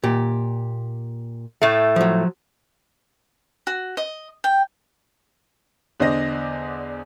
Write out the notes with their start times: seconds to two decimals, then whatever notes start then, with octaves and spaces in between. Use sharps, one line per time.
0.03 A#2 G4
1.62 A2 A3
1.96 F3 F#3
3.67 F#4
3.97 D#5
4.44 G5
6.00 E2 D3 D4 C5 D#5 A#6